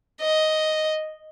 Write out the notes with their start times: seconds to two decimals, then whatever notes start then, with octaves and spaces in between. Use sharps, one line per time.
0.21 D#5